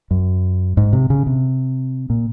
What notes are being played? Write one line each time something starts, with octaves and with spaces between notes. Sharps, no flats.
F#2
G#2
C3
C#3
C3
A#2